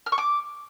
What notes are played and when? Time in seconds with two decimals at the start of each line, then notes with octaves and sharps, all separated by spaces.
0.06 F6
0.12 C#6
0.18 D6